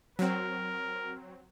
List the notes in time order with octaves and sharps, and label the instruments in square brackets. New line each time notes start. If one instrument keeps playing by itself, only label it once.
[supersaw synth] F#3 C4 [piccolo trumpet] A#4